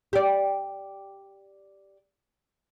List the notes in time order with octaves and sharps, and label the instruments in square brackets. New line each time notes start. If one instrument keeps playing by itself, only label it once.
[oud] G4 D5